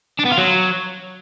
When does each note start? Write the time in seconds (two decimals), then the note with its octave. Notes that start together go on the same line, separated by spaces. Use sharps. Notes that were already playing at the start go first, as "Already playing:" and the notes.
0.19 D4
0.25 B3
0.31 F4
0.37 F#3